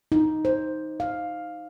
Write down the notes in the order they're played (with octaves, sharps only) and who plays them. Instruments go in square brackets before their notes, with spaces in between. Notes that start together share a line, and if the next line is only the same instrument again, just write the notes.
[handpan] D#4
C5
F5